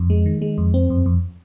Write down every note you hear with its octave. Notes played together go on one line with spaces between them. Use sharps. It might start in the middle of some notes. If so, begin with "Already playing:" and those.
Already playing: F2
G#3
D#3
G#3
F2
C4
F2
F2